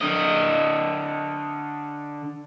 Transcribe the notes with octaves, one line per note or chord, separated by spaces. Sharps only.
D3 D#5